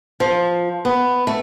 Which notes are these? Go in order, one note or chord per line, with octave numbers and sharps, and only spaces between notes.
F3
B3
A3